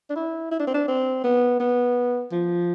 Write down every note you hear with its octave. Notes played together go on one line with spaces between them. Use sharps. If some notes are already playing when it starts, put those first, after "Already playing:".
D4
E4
E4
D4
C4
D4
C4
B3
B3
F3